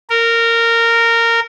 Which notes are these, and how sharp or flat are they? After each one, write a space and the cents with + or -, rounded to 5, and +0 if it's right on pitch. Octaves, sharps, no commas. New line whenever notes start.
A#4 -15